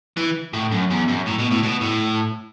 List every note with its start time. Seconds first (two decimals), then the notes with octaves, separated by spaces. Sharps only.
0.17 E3
0.53 A2
0.71 F#2
0.90 E2
1.08 F#2
1.26 A2
1.38 B2
1.51 A2
1.63 B2
1.81 A2